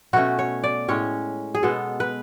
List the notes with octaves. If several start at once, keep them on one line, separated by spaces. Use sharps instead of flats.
B2 A3 C#4 F#4
C#5
D5
A2 G#3 C#4 C#5
G#4
B2 G#3 B3 A4
B4